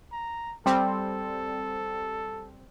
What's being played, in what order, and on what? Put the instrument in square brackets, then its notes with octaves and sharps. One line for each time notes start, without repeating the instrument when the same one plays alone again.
[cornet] A#5
[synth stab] G3 C4 [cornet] A4